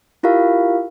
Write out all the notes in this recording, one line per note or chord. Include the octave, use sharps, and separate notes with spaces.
E4 F4 G4 A#4 F5